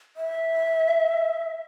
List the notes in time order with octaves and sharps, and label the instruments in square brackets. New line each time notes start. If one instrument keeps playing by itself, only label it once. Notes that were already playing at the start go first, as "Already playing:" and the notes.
[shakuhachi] E5